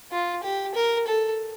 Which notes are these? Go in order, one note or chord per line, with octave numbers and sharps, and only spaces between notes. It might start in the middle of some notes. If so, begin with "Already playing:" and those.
F4
G4
A#4
A4